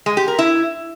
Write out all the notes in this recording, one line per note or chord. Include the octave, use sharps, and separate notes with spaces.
G#3
G4
A#4
E4